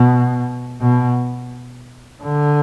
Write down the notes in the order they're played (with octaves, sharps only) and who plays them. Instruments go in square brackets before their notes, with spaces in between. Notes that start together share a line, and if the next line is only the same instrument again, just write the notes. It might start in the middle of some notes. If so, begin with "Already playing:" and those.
Already playing: [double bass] B2
B2
D3